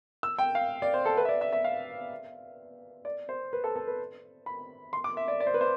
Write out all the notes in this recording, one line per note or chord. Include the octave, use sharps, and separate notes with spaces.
E6
G5
F5
D5
C5
A4
B4
E5
D5
E5
E5
F5
D5
C5
B4
A4
A4
B4
B5
C6
D6
E5
D5
D5
C5
B4
C5